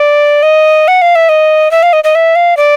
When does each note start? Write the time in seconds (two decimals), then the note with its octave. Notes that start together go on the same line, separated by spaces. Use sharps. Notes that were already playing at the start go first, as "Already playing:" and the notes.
Already playing: D5
0.43 D#5
0.88 F#5
1.02 F5
1.15 E5
1.29 D#5
1.71 E5
1.83 F5
1.93 D#5
2.04 D#5
2.15 E5
2.36 F5
2.57 D5